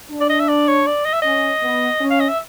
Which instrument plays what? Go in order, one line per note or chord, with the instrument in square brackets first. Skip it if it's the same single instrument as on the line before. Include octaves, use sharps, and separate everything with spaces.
[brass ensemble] D4
[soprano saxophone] D5
D#5
E5
D5
C#5
D5
D#5
E5
[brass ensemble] C#4 [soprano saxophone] D#5
[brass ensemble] B3
C#4
[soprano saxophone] F5
D#5
E5